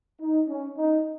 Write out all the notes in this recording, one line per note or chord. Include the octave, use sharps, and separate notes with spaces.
D#4
C#4
D#4